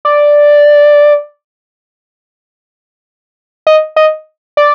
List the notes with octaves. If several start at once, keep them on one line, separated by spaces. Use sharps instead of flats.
D5
D#5
D#5
D5